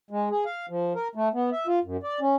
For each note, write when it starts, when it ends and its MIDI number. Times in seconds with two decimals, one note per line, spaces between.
0.11 0.29 56
0.30 0.44 68
0.46 0.66 77
0.69 0.93 53
0.95 1.08 70
1.15 1.29 57
1.34 1.50 59
1.52 1.67 76
1.67 1.79 65
1.84 1.97 42
2.03 2.20 74
2.21 2.36 61